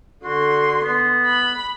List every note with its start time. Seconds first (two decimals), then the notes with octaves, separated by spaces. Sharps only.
0.24 D3 F#4 C6
0.83 B3
1.26 B5